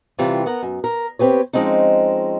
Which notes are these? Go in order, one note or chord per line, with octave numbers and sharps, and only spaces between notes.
C3 E3 G3 F4
B3 A#4 F#5
F#2
A#4
C4 G4 B4 C#5
F3 G#3 C4 C#4 D#4